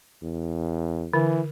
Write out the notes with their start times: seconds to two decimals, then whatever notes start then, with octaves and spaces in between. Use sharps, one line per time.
0.23 E2
1.13 D3 E3